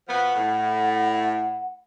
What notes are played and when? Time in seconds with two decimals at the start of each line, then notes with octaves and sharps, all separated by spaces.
0.08 B2 F3 B3 F#5
0.35 A2